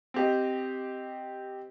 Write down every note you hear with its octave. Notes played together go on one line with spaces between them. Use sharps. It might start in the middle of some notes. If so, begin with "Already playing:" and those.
C4 G4 D#5